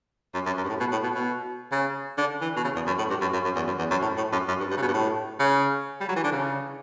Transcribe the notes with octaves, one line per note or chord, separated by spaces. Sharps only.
F#2
F#2
F#2
G2
A2
B2
A2
B2
B2
C#3
D3
E3
B2
C#3
E2
F#2
A2
G2
F#2
F#2
F#2
E2
F#2
E2
F#2
A2
A2
F#2
F#2
G2
G2
C#3
B2
G2
A2
C#3
G3
F#3
E3
D3
C#3